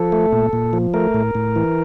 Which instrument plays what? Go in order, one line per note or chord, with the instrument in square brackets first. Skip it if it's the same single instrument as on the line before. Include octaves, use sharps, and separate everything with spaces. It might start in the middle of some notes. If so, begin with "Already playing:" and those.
Already playing: [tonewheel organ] F3 A4
A3
A#2
A#2
F3
A3 A#4
A2
A2
E3